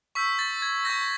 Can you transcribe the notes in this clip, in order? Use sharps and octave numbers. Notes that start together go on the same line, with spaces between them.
C#6 E6 G6 B6
A6
G#6
C#6 E6 G6 A#6